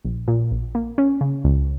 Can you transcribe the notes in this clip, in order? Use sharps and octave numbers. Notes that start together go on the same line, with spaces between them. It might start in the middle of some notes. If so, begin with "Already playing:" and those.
A#1
A#2
A#1
A#3
C#4
C#3
C#2